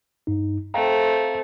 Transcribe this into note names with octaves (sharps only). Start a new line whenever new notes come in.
G2 D#4
A3 C4 F5 G5 A#5